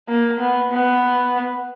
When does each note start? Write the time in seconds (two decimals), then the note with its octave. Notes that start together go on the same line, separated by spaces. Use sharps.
0.08 A#3
0.40 B3
0.72 B3